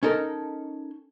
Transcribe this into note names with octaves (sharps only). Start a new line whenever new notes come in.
C#4 D#4 A4 A#4